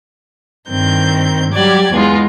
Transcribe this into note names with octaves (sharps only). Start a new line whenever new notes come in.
G2 D#3 C4 G6
F#3 G3 G4 D5 G#6
E2 G#3 B3 F4